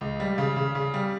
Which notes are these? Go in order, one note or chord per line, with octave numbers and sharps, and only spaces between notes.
C#2
G3
C#3
C#3
C#3
G3